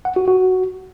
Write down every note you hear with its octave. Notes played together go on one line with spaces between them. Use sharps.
F#5
F#4
F#4